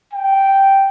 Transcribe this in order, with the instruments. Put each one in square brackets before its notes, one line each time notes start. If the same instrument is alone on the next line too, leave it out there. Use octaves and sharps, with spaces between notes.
[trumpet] G5